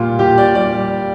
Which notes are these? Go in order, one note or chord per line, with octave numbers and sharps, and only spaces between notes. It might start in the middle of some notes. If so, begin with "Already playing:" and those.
Already playing: A#2 G3 F4
A#2 G4
D5
G3 D5